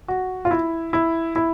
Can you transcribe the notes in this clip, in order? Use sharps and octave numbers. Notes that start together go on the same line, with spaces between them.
F#4
F4
E4
E4
E4